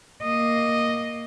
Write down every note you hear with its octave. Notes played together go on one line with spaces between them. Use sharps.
A#3 D#5